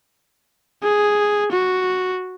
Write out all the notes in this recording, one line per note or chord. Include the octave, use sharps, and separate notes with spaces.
G#4
F#4